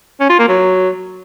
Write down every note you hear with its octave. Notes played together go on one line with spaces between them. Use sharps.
C#4
F4
A#3
F#3